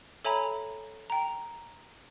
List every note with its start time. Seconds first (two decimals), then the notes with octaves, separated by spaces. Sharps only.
0.25 A4 C#5 E5 G#5 A#5 B5
1.10 G5 A#5